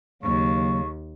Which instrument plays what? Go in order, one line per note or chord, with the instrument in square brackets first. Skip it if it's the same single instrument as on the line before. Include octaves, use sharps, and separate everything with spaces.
[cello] D#2 [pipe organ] C#3 F#3 A#3 [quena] C#6